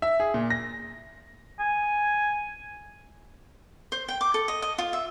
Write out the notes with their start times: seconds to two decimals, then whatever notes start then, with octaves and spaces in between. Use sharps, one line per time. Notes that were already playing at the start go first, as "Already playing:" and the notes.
0.02 E5
0.20 G#4
0.34 A#2
0.50 A#6
1.59 G#5
3.92 C5
4.08 G5
4.21 D6
4.34 A4
4.48 D#5
4.62 D#5
4.78 F4
4.93 E5